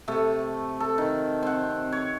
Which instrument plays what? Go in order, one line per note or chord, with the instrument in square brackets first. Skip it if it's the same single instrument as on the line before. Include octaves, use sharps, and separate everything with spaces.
[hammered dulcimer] C3 A3 A4
A4
D#3
C4 F#5
C#5